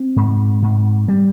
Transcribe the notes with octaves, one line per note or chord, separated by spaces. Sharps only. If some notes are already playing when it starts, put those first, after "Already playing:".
Already playing: C4
G#2
G#2
G3